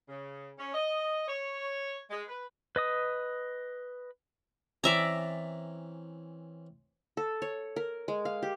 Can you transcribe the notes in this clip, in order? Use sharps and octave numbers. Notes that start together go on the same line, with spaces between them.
C#3
C#4
D#5
C#5
G#3
B4
B4 D#5 D#6
E3 C4 C#4 D5 E5 A#5
A4
C#5
A#4
G#3
F5
G4